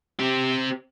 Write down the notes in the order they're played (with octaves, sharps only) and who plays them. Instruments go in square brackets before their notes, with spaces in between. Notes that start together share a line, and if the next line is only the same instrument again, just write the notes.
[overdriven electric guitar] C4 G4